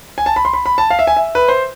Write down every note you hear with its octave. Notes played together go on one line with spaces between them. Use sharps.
G#5
A5
B5
C6
B5
B5
A5
F5
E5
G#5
E5
B4
C5